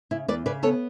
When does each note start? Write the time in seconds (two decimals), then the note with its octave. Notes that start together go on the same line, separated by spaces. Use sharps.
0.11 C#3 E4
0.28 E2 B4 D5
0.46 C#3 B4 D5
0.63 B3 A4 C#5